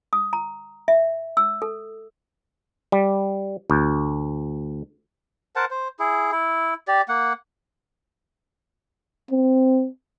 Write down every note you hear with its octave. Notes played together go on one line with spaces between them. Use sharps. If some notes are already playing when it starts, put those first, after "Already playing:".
D#6
A#5
E5
E6
A4
G3
D2
A#4 C5 F#5 A5
C5
E4 G#4
E4
G4 D5
A#3 F#5
C4